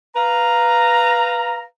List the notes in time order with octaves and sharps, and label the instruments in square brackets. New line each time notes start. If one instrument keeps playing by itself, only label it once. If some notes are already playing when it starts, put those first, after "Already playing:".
[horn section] B4 F5 A#5